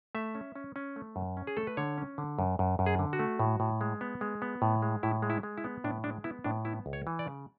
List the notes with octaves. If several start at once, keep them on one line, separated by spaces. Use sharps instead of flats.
A3 E5
C#4
C#4
C#4
A3
F#2
C#4
G#4
A3 A4
B4
D3 C#5
C#4
D3
F#2
F#2
F#2
G#4
D3
F#4
A3
A2
A2
G#3
B3
G#3
B3
A2
G#3
A2 E4
G#3
E4
G#3
E4
B3
A2 D4
G#3 D4
B3 E4
A2 D4
B3 E4
C#2
C#5
E3
D5
C#3